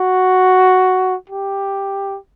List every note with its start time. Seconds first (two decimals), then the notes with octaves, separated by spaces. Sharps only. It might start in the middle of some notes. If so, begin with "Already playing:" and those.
Already playing: F#4
1.30 G4